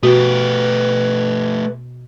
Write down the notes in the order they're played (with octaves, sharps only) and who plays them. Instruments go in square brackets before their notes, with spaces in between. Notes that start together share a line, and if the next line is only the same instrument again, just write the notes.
[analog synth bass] B2 [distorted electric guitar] A3 G4 [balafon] F#4 [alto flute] B4